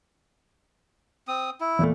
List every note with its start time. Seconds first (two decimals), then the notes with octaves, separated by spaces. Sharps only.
1.28 C4 D#6
1.61 E4
1.79 E2 A#2 A3